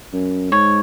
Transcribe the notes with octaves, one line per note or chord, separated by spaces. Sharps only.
F#2
G#2 C#5